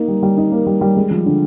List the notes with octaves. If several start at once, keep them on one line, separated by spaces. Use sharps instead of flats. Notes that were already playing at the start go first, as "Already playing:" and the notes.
Already playing: A#3 D#4
G3
G3
D#4
A#3
G3
G3
G#3
F3
D3